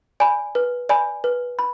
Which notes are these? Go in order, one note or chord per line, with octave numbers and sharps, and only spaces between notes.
D5 G#5 B5
B4
D5 G#5 B5
B4
B5